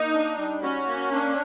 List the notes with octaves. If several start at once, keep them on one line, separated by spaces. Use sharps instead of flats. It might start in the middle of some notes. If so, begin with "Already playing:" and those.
Already playing: A#3 D#4
D4
G3
C#4 F#4
A#3
D4